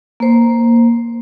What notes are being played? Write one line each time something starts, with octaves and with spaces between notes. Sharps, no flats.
A#3 C5